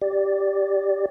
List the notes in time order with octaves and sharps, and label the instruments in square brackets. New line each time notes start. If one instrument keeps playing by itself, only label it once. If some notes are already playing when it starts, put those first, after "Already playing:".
[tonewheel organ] G4 D5